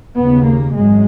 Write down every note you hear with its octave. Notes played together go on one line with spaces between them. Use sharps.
D#2 C#3 B3
A#3
G#1 F#2 G#3